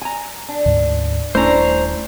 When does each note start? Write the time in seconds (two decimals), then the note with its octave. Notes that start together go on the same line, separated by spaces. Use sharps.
0.02 G#5 A#5
0.49 D4
0.66 D2 G#2
1.35 D#1 A3 C#4 D4 E4 C5 A#5